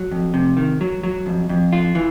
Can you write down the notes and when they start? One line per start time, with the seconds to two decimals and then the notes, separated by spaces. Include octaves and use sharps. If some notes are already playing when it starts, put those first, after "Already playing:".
Already playing: F#3
0.12 F2
0.34 C3
0.57 D#3
0.81 F#3
1.03 F#3
1.26 F2
1.49 F2
1.73 F4
1.95 E3